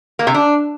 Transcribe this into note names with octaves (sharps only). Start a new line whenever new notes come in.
A#3
C3
D4